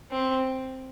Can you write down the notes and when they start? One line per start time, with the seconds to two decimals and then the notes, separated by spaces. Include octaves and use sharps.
0.11 C4